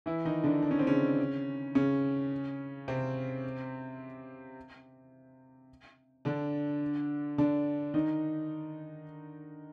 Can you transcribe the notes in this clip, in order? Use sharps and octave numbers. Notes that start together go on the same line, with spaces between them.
E3 E4
D#3 D#4
D3 D4
D4
C#4
C4
C#3 C#4
C#3 C#4
C3 C4
D3 D4
D3 D4
D#3 D#4